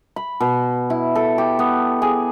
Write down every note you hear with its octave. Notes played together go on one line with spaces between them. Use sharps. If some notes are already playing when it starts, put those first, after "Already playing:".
B5
B2
E4
A4
G4
B3
G#4